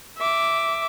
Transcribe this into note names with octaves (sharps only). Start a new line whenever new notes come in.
E5 D6